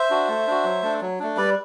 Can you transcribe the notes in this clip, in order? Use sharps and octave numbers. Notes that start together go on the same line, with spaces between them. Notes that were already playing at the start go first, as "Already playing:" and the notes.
Already playing: C5 E5
D4 F#4
A3
D4 F#4
F#3
A3 D4
F#3
A3 D4
G3 B4 D5